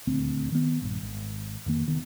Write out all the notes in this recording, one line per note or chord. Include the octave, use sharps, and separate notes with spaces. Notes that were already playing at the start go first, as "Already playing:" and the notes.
D#1 D2 C4
D#3 B3
A#1 G2
G#1
F2 D#3 A#3
F1 D#3 B3